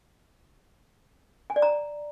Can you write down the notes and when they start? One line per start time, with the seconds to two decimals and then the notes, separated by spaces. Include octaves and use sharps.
1.50 G#5
1.56 D5
1.62 A#5